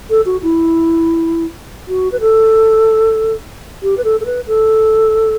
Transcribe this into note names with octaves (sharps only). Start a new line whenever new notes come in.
A4
F#4
E4
F#4
B4
A4
G4
B4
A4
A4
B4
A4